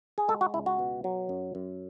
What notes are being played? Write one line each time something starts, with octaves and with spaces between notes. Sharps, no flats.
G#4
G#3 A4
F#4
C#2 E4
F#4
B2
F#3
F#2
F#2